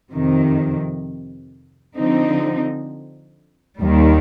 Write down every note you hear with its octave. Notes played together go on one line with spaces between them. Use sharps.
F2 C3 D#3
D3 F3 C4 D#4
D#2 D#3 G3